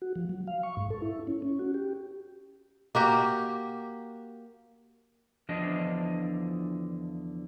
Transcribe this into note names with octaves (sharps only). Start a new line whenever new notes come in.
F#4
F3
F#3
F5
C#6
G#2
A4
E4
C#4
C#4
F#4
G4
A#3 F#4 G4
E2 D3 F3 D4 D#5